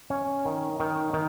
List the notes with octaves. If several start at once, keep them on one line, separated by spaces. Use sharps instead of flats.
C#4 C#5
D#3
D#3
D#3